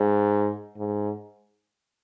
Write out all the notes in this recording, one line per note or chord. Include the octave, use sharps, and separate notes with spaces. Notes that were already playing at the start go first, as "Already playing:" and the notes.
Already playing: G#2
G#2